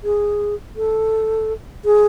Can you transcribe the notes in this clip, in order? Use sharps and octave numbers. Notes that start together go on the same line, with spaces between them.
G#4
A4
G#4